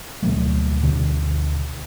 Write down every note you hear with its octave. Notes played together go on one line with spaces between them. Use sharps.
D2 B2 F#3 A3
D2 B2 D3